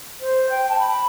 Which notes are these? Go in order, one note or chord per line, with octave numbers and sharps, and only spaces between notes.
C5
G5
A5
B5